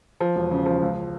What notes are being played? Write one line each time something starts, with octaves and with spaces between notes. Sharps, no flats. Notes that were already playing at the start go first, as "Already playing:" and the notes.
F3
E1
C#3
F3
C#2